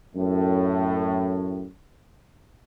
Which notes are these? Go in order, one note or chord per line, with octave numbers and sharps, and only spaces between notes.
F#2 A2